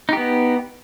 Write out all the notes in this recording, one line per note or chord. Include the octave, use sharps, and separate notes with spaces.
B3 D#4 G4